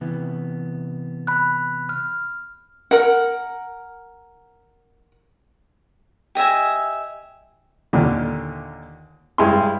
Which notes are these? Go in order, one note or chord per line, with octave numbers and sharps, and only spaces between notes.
C3 E3 B3
B5 F#6
F6
A#4 F#5
G4 D#5 E5 G#5
D#2 A#2 D3
G2 G#3 E4 G#5 C6